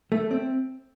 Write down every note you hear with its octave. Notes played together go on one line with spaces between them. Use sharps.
A3
C4